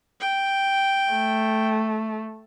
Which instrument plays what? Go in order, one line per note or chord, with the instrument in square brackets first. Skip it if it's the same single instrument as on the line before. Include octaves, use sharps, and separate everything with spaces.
[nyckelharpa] G5
[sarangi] A3